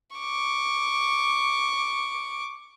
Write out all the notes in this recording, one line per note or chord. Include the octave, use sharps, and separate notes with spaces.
C#6 D6